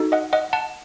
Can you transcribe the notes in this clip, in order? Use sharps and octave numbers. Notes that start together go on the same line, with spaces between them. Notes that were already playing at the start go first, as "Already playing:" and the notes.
Already playing: D#4 F#4 A4
D#5 F#5
D#5 F#5
F#5 A5